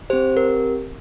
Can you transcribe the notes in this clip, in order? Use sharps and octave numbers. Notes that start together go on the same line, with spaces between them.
C4 G4 C5
A#4